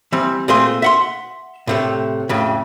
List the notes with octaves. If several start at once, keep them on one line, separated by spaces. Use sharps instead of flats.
E3 G3 C4
A#2 A3 C4 G#4 C6
E5 F#5 C6
A2 C3 A3
F2 A2 C#3